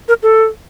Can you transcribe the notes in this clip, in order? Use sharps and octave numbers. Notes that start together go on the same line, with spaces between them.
A#4
A4